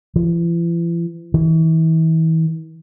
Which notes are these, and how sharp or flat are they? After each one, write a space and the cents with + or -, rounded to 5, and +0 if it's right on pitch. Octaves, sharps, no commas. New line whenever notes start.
E3 +45
E3 -40